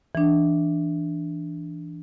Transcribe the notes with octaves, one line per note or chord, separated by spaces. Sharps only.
E3 D4